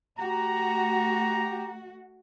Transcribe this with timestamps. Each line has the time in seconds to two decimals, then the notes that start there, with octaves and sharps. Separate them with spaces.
0.18 A3 F#4 G4 A#5